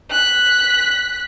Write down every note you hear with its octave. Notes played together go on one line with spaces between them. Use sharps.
F#6 B6